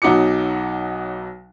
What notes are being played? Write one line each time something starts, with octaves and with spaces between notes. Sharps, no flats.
B1 F#3 D#4 F#4 D6 C#7